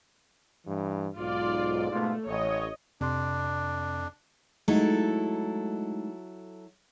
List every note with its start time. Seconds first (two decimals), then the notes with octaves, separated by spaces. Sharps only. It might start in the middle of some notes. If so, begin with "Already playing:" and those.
0.67 G2 E3
1.17 B1 G#2 F4 D5
1.91 G#2 B2 A3 F4
2.28 A1 C#5 D#5
3.01 F2 C3 D4 C6
4.68 F#3 G#3 A3 D#4 E4 A4